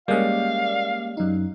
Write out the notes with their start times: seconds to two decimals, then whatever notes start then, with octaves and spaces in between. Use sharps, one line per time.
0.08 G3 G#3 A#3 C#4 D5 F5
1.17 F#2 D#4